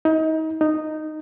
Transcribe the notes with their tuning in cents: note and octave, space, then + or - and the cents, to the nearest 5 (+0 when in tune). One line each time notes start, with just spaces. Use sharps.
D#4 +30
D#4 -10